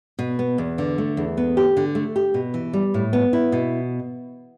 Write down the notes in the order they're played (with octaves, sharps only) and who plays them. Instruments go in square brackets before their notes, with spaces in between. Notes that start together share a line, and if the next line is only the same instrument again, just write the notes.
[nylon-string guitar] B2
B3
E2
D3
A3
E2
B3
G4
D3
A3
G4
B2
E3
G3
A2
B3
E4
B2